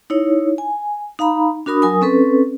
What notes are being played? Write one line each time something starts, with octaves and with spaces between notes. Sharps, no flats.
D#4 E4 C#5
G#5
D#4 F5 A#5 B5
D4 F#4 A#4 B5 D#6
F#3 A#4 G#5 D#6
C4 C#4 A4 B4